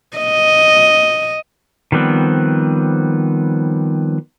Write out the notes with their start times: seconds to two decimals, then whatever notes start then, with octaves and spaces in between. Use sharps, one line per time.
0.17 D#5
1.92 D#3 F3 G3 B3 C4